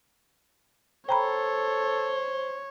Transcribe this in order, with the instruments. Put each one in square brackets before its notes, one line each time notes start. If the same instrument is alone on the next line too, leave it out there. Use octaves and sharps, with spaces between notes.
[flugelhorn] A4 [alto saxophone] C5 [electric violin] C#5 [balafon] G5 A#5 B5